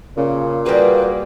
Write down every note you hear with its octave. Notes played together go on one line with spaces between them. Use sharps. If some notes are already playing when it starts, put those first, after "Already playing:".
A#2 C#3
G3 A#3 F#4 G#4 B4